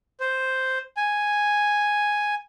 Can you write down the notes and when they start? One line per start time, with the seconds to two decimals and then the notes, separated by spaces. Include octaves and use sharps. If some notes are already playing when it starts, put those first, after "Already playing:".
0.20 C5
0.97 G#5